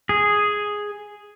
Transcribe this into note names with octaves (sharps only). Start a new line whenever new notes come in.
G#4